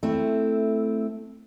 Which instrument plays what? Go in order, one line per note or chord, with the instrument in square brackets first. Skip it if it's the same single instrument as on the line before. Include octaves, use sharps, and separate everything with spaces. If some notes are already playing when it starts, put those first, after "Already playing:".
[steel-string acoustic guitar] A3 C4 E4